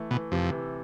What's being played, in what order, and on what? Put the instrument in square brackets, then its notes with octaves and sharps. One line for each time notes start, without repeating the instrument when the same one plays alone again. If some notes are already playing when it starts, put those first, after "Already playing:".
Already playing: [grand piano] E3 A3
[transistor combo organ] B2 [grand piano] E3
[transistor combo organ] F2 [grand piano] C3
[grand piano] E3